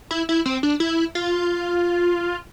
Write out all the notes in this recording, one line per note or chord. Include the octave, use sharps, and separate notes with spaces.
E4
E4
C4
D4
E4
F4